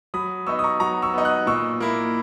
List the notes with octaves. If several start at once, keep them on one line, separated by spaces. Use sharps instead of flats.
F#3 B5 D#6
B3 D#4 C#6 E6
D#6
A#5 C#6
F#3 A#5 C#6
C#6 E6
B3 D#4
D#6 F#6
A#2 C#6 E6
A#3 E4